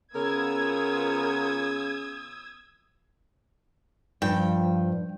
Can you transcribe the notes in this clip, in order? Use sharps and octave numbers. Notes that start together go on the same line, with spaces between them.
C#3 B3 F4 A#4 D#6 E6 G#6
G2 F3 G5